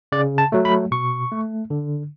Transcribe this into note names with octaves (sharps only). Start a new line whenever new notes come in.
C#3 D5
A5
F#3 A3
B5
B2 C#6
A3
D3